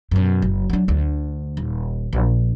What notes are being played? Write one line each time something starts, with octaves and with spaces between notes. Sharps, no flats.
F#2 B2
F#1
F#3 D4
D2 D4
D#1
A#1